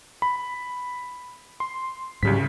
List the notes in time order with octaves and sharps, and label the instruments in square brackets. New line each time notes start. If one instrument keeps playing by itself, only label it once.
[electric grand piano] B5
C6
[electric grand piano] C2 C#3 B6 [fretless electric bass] G#2 F#3 G3